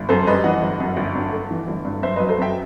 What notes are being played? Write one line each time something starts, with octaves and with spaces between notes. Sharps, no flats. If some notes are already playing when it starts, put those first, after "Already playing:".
Already playing: G1
F#2 A4 C5
G3 B4 D#5
E3 D#5 F#5
G1
F#2
G1
G2
A3
E3
G1
G2
F#2 C5 E5
F#3 B4 D#5
A4 C5
F#2 E5 G5